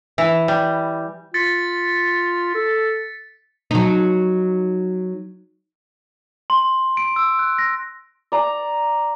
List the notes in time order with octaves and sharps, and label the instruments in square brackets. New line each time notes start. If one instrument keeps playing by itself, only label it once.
[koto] E3
G3
[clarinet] F4 [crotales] A6 B6 C#7
[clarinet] A4
[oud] F#3 D#4
[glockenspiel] C6
D7
E6
F#6
A#6
[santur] D5 A#5